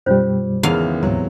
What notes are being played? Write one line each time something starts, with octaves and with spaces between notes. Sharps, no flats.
F#2 B2 G3 C#4 F4 C5
G#1 E2 C#3 F5 F7
D2 G#2 C3 F#3 G#3